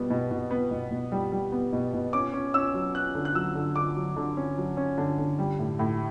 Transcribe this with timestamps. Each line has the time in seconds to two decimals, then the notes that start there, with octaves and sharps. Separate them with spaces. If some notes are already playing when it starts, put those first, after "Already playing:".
Already playing: B2 G3 B3
0.10 B2
0.31 B2
0.51 B3
0.71 B2
0.91 B2
1.12 G3
1.32 G3
1.52 B3
1.72 B2
1.93 B2
2.13 C#4 D6
2.33 C#4
2.54 C#4 E6
2.74 F#3
2.95 C#4 F#6
3.15 D3
3.25 F#6
3.35 F#3 E6
3.55 D3
3.76 D3 D6
3.96 F#3
4.16 D3
4.37 C#4
4.58 F#3
4.77 C#4
4.98 D3
5.18 D3
5.39 G3
5.59 A2
5.79 A2